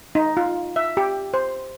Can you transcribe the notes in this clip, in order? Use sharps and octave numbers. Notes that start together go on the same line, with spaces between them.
D#4
F4
E5
G4
C5